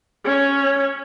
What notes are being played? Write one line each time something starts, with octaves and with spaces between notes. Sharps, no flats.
C#4 C#5